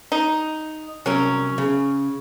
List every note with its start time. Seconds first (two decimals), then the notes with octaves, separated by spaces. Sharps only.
0.12 D#4
1.06 C2 F#3 C#4 A#4
1.58 C#3